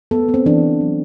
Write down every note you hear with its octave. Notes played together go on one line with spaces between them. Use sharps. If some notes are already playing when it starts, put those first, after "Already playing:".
B3 A4
B3
C4
E3 D4
E3
F#3